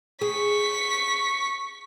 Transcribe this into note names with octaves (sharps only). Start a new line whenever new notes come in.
G#4 C#6 B6